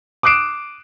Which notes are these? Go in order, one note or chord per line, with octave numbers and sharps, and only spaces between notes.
D6 D#6 F#6 C7 D7 E7